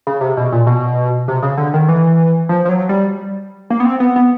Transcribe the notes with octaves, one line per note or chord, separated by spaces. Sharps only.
C#3
C3
B2
A#2
B2
C3
C#3
D3
D#3
E3
F3
F3
F#3
G3
A#3
B3
C4
B3
B3